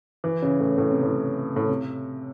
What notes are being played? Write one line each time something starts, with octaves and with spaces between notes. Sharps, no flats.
E3
C#3
A2
A2
C3
A2
A2
C3